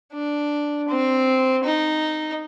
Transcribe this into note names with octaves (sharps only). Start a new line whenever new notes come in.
D4
C4
D#4